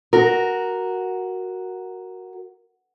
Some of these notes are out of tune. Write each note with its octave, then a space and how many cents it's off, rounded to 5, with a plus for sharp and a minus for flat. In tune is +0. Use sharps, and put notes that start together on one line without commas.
F#4 +0 A#4 +0